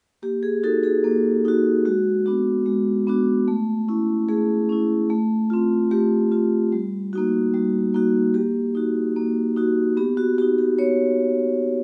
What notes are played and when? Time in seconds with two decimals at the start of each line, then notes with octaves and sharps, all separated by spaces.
0.22 A#3 G4
0.43 G#4
0.63 D#4 F#4 A4
0.83 G#4
1.04 A#3
1.45 D#4 F#4
1.85 G#3 F#4
2.26 B3 D4 F#4
2.66 G#3
3.07 B3 D4 F#4
3.48 A3
3.88 C#4 E4
4.29 A3 G#4
4.69 C#4 E4
5.10 A3
5.50 C4 F4
5.91 A3 G4
6.32 C4 F4
6.72 G3
7.13 A#3 D#4 F#4
7.54 G3
7.94 A#3 D#4 F#4
8.34 A#3 G4
8.75 D#4 F#4
9.16 A#3
9.56 D#4 F#4
9.97 B3 G4
10.17 F#4
10.38 F#4 G4
10.42 D#4
10.59 G4
10.78 B3 C#5